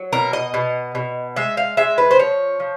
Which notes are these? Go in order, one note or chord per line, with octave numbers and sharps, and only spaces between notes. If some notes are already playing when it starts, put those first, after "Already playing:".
Already playing: F#3
B2 A#4
D#5
B2
B2
G#3 E5
F5
G#3 E5
B4
C5
F3 C#5
F3